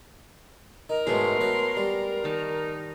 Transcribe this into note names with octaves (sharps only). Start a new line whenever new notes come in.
D#4 A#4
G#2 B2 F#3 G#3 A3 B3 C6
F#3 B4
G3
D#3 D#4 A5